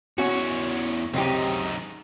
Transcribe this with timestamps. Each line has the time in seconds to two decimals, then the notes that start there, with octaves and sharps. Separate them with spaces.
0.18 E2 C#4 F#4 C#5
1.13 C#2 F#2 C3 D#4 G4